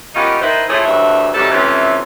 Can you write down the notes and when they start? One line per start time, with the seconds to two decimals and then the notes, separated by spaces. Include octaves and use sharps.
0.15 A#3 B3 C#4 D#4 F4 G4
0.41 D#3 D#4 E4 B4 C5
0.69 A2 F3 A3 C#4 E4 G#4
0.85 D2 G2 E3 F#3 E5
1.34 C3 D#3 E3 F#3 G3 A4
1.51 F2 C3 E3 A3 C#4 E4